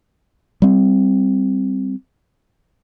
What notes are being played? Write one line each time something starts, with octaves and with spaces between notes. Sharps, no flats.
G3 C4